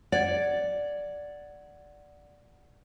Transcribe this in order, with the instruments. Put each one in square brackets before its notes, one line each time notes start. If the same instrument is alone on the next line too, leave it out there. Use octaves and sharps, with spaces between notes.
[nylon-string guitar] D5 [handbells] F#5 G#6